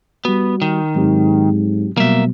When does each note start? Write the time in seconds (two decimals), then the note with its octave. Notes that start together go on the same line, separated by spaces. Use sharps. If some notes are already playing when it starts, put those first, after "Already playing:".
0.25 G3 B3 F#4
0.62 D#3
0.95 G#2 F#3 C4 G4
1.97 B2 F#3 G3 A#3 E5